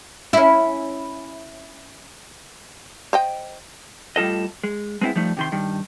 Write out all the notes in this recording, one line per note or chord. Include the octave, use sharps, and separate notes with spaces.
C#4 E4
C5 D#5 G5
A2 G3 F4 A4 D#5
G#3
G#3 B3 C4 D#4 E4
F3 G3 A3 D#4
C3 D#3 C6
G2 D#3